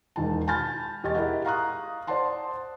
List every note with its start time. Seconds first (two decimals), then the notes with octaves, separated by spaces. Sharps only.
0.16 E1 D#3 A5
0.47 G#5 A5 B5 F6 G6 A6
1.03 E1 G4 D#5 C#6 A6
1.15 E4 G4 G#4 A#4 D#5 F#5
1.45 F5 A#5 C#6 D#6 F#6
2.07 C5 D5 F#5 A5 C6